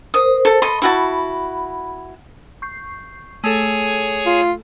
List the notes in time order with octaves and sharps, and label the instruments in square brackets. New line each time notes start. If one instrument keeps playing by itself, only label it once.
[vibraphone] A#4 C5 [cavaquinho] D#6
[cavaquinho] A4
[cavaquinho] A4 D#5 C6 [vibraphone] B5
[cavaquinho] E4 F#4 A5
[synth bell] C#6 G6 C7
[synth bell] A3 A4 [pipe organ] G#4 C#5 G#5
[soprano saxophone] F4